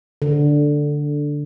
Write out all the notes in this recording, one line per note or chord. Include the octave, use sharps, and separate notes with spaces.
D3